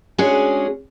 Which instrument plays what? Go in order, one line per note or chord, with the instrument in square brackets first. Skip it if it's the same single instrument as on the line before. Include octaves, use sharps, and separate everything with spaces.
[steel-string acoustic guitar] G#3 C#4 D4 F#4 G#4